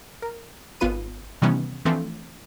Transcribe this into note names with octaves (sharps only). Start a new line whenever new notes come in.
A#4
G#1 B3 F4 B4 D#7
C3 D#3 E3 G3 B3 C#4
E3 F3 A3 C4 D4